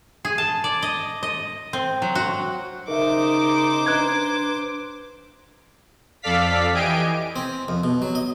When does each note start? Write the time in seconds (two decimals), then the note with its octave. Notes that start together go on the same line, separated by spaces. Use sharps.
0.25 G#4
0.38 A5
0.64 D5
0.83 D#5
1.23 D#5
1.73 C4
2.02 F#3
2.15 F#4
2.88 C#3 C#4 D#4 A#4 C5 E5 D6
3.86 D4 B4 A#5 F#6 G#6
6.22 F2 A4 D5 F5 B6
6.72 E3 G4 D#5 G#5 D7
7.36 C4
7.68 F2
7.84 B2
8.02 F#3
8.15 D#5